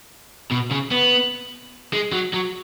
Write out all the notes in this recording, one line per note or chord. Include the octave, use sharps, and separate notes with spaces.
B2
C#3
B3
G#3
F#3
F#3